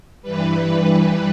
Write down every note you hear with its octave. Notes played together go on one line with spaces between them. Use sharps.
G2 E3 G3 B4